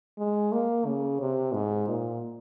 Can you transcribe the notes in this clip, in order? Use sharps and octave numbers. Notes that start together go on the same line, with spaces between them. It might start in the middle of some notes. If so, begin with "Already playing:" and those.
G#3
A#3
C#3
C3
G#2
A#2